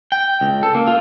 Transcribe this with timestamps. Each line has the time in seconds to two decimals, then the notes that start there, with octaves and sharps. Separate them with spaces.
0.12 G5
0.41 C#2
0.63 A4
0.75 A#3
0.87 F4